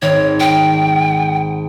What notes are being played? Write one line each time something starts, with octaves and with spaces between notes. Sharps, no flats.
G#1 C#5
G5